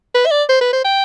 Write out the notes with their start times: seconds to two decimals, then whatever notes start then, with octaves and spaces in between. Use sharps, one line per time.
0.14 B4
0.26 E5
0.31 D5
0.49 C5
0.61 B4
0.72 C5
0.84 G5